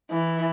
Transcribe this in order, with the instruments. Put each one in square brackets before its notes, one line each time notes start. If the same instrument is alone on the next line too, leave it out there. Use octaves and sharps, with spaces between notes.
[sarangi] E3